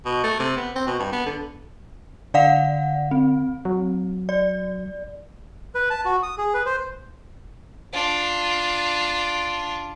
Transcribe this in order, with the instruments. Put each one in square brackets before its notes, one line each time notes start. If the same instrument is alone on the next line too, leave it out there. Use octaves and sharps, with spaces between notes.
[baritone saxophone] B2
A3
C3
B3
C4
B2
G2
B3
D3
[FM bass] D3 [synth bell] D5 F5 F#5
[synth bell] C4
[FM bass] F#3
[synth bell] D5
[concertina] B4
A5
F#4
D#6
G#4
B4
C5
[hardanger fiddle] D4 F4